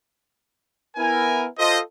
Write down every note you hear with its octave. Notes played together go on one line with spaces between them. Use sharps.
B3 E4 A#4 G#5
F4 A4 C5 D#5